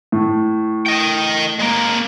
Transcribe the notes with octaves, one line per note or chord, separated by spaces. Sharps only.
A2
D#5 G5
G#3 A#3